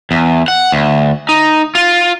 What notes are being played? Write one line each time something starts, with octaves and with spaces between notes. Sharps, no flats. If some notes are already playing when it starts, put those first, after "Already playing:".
E2
F#5
D2
D#4
F4